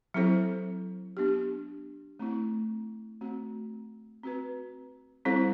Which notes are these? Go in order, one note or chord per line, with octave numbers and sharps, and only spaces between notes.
F#3 C4 E4 A4 C5
B3 D4 G4
A3 C4 E4
A3 C4 F#4
C4 F#4 B4
G3 C4 E4 A4 C5